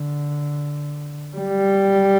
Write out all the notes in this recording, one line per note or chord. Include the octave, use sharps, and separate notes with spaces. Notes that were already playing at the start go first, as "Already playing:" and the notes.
Already playing: D3
G3